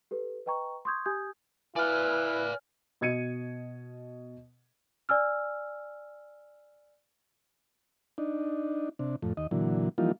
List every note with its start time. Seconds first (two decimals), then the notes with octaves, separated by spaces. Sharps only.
0.11 G4 A4 B4
0.46 B4 D#5 G5 A#5 C#6
0.85 C6 C#6 D#6 G6 G#6
1.05 G4 G#5 D#6 G6 G#6
1.76 E4 B4 D5 F5 G#5 F6
3.01 B2 D#5 G#6 C#7 D#7
5.09 D5 G#5 E6 F6
8.18 D4 D#4
8.99 C3 D4
9.22 F2 A2
9.37 D#2 D#5
9.51 A#2 D3 E3 F#3
9.98 E3 F3 G3 A#3 D#4 F4